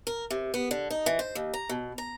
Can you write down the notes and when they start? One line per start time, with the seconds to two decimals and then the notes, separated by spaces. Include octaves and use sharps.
0.07 A#4
0.31 C3
0.54 B3
0.71 D3
0.90 D#4
1.06 E3
1.19 C5
1.35 D#2
1.54 A#5
1.69 B2
1.98 A#5